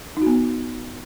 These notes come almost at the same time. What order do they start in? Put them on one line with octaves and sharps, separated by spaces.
D#4 F#4 B3